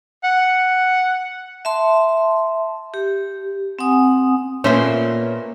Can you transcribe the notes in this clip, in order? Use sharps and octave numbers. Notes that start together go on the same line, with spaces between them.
F#5
E5 A5 C6
G4
C4 F#5 G#5 D#6
A#2 A3 B3 C#4 C5 E5